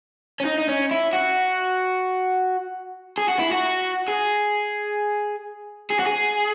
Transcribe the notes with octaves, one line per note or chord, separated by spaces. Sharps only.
C#4
D#4
D#4
C#4
E4
F#4
G#4
F#4
E4
F#4
G#4
G#4
F#4
G#4